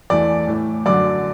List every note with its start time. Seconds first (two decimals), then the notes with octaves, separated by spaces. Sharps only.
0.10 E2 E3 A3 D5 D6
0.47 A2 E3 A3
0.86 F#2 D3 F#3 D5 D6